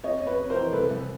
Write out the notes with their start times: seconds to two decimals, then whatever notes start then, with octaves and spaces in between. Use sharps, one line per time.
0.04 F2 C#5 D#5
0.21 F2
0.27 B4 C#5
0.39 C3
0.50 A#4 C5
0.56 E3
0.73 C2 A4 B4
0.90 C2